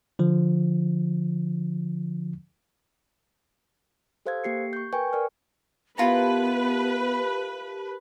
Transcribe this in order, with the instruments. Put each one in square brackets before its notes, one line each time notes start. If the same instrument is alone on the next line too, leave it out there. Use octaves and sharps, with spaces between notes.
[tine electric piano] D3 F3
[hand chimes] G4 A4 C5 F5 E6 G#6
A#3 G4 C7 C#7
C#6 G6
A#4 B4 G5 G#5 C#6
A#4 D5 G#5 F6
[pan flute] B3 [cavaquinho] E4 F4 A#5 [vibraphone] G4 A#4 A5 [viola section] B4